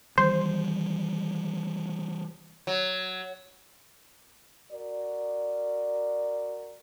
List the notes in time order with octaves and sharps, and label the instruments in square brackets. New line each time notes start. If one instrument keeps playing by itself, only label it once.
[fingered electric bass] D#3 E3 G3 [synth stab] C5
[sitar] F#3
[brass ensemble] F#4 A#4 D5